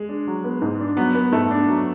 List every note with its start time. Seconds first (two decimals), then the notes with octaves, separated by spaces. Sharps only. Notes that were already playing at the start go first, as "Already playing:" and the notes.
Already playing: G#3
0.09 D4
0.27 F#3
0.44 B3
0.62 G#2
0.80 D4
0.97 F#3 B3
1.15 B3
1.32 G#2 A3
1.51 D4
1.68 F#3